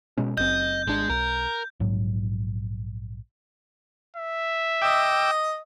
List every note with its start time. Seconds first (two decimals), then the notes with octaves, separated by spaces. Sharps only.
0.18 B2 G#3 C#4
0.38 F#1 F#2 C4 D#5 G6
0.88 G#1 G#3 D4
1.10 B1 A#4
1.80 A#1 G#2 F#3
4.17 E5
4.82 D#5 G5 D6 E6